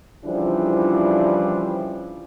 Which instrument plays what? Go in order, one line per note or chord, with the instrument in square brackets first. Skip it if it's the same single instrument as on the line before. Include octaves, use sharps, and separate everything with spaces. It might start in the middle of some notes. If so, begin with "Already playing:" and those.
[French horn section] C#3 E3 F3 G3 D4 E4